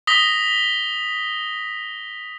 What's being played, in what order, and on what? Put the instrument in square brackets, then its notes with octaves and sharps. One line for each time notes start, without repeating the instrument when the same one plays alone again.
[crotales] D#6 A#6 B6 G7